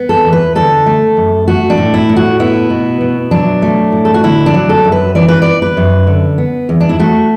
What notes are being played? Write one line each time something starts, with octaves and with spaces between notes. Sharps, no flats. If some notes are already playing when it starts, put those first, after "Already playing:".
Already playing: B3
A4
E2
B4
D3 A4
A3
F#2
A3 F#4
D4
A2
E4
A2
F#4
B3 E4
B2
B2
F#3 D4
A3
A2
A4
F#4
D3 E4
D4
F#3
A4
F#2
B4
E3 D5
B4
B3 D5
B4
F#2
D3
B3
E2
D4
E4
A3 F#4